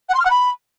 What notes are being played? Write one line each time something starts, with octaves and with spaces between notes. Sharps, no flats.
F#5
C6
F6
F#5
B5